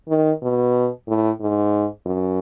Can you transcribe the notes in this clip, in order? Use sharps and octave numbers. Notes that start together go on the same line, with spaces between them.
D#3
B2
A2
G#2
F#2